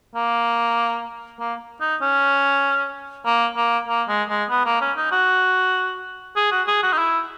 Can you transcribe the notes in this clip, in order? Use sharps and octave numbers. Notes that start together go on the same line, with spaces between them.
A#3
A#3
D#4
C#4
A#3
A#3
A#3
G#3
G#3
B3
A#3
C#4
D#4
F#4
G#4
F#4
G#4
F#4
D#4
E4